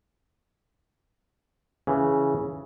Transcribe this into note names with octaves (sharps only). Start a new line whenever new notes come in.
C#3 E3